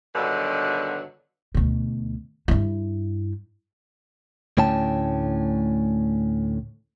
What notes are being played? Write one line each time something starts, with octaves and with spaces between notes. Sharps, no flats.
G2 B2 D3 D#3 F#3
D2 B2
G2 E4
D2 A2 C#4 G5 A5